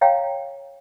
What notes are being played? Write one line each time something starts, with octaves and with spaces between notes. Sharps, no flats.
C#5 F5 G5 A#5